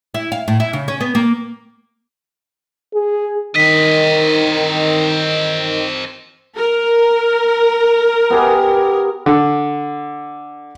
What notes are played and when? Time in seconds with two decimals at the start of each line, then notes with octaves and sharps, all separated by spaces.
0.14 E4
0.32 F5
0.48 A2
0.60 E4
0.73 C#3
0.88 C#4
1.00 B3
1.15 A#3
2.94 G#4
3.56 D#3 C4 D#5 B6
6.56 A#4
8.30 B3 G4 G#4
9.26 D3